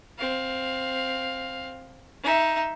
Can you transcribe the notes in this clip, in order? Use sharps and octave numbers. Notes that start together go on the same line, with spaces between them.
C4 F5
D#4 E5